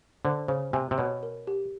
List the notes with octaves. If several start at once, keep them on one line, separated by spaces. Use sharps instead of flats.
D3 C5
C#3 C5
C3 G#5
C3
B2 C#5
A#4
G4